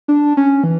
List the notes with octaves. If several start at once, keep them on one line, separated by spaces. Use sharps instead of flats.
D4
C#4
E3